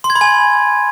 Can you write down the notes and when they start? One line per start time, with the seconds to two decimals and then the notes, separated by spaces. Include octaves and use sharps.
0.04 C6
0.10 G#6
0.16 B5
0.21 G#5